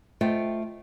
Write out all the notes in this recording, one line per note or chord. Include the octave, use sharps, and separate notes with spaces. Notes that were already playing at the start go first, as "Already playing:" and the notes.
A3 F4 C5 D#5 F#5 G5